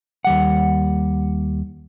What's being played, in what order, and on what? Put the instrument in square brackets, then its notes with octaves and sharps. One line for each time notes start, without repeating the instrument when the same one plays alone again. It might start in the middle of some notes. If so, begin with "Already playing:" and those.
[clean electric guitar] D#2 G3 F#5